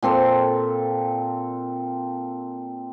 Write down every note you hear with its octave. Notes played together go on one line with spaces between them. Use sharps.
A#2 C4 A4 C6